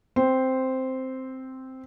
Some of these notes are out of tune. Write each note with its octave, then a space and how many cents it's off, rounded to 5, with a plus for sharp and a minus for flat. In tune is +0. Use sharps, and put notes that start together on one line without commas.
C4 +0 C5 -5